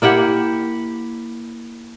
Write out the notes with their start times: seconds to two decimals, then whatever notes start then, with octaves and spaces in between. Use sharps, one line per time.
0.02 A#3 E4 G4 F#5